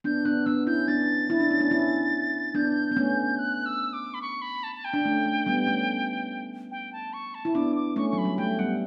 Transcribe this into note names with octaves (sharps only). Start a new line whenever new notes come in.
B3 D4 G6
B3 D4 F#6
B3 D4 E6
C#4 E4 G6
B3 D4 A6
E4
D4
C#4
B3 D4
C#4 E4
B3 D4 G6
B3
A3 C#4
F#6
E6
D6
B5
C#6
B5
A5
A5
G5
D4
A3 C#4
A3
G3 B3
A3 C#4
G5
A5
C#6
A5
E4
B3 D4 D6
D6
A3 C#4 C#6
C#6
F#3
B5
G3
A3 G5
G3 B3 F#5